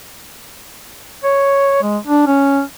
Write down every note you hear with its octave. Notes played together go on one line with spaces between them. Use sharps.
C#5
G#3
D4
C#4